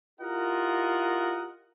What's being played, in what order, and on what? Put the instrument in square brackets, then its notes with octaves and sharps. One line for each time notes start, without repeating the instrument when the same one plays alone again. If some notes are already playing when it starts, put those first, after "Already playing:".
[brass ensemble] E4 F4 G4 A#4 D#5 F#5